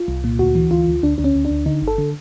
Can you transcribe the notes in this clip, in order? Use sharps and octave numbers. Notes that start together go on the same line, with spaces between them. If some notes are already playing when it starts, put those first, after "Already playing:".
Already playing: F4
C2
A#2
D2 F#4
E3
D2 F4
D2
D2 D4
D2 D4
C#4
D2
D4
D2
D3 D#4
G1
A4
D3